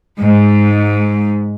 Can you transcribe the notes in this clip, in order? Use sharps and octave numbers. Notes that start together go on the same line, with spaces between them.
G#2